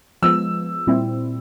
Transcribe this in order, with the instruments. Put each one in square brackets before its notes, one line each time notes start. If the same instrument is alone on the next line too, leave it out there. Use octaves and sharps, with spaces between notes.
[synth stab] F3 G#3 B3 [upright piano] E6
[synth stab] A#2 G3 C4 E4